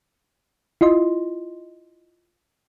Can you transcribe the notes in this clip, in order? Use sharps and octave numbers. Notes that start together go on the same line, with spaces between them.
E4 F4 D#5 C6